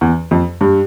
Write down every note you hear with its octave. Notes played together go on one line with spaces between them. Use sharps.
E2
F2
G2